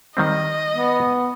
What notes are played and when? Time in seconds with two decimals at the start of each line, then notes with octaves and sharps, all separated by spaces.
0.17 D#3 G3 C4 D#5
0.77 B3